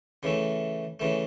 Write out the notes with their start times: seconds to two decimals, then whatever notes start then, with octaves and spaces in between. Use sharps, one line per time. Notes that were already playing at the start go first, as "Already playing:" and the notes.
0.23 C#3 E3 A3
1.00 C#3 E3 A3